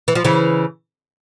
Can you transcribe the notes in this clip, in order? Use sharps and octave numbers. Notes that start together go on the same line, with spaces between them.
E3
F3
C#3 E3